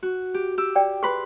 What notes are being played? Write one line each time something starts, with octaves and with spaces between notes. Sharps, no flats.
F#4
G4
G4 E6
D5 G5
G#4 B4 B5 C6